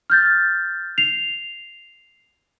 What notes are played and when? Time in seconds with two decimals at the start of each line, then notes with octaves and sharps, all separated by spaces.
0.10 F6 G6 A6
0.98 C7 F7